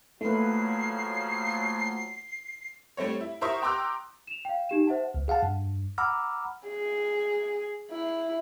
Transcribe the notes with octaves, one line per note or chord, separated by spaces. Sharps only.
C#3 F3 F#3 A3 A#3 E4 B4 C7
G3 A3 C4 C#5
E4
E4 A#4 C5 E5 C#6 D#6
G5 A#5 C6 D6 E6 F#6
E7 F7
F5 G5
D#4 G4 E7
C5 E5 F#5 A5
C#2
G#4 F5 F#5 A5
G2
F#5 A#5 B5 D6 E6 F6
G#4
E4